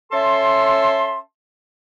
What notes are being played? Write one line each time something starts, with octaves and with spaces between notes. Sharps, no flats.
C#4 A4 E5 A5 C6